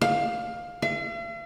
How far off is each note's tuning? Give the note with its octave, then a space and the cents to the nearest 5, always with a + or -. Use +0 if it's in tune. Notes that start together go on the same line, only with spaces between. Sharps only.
F5 +15
F5 -45